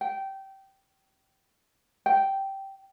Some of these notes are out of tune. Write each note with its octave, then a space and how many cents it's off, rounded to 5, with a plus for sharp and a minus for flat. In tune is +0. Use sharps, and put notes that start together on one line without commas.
G5 -20
G5 -10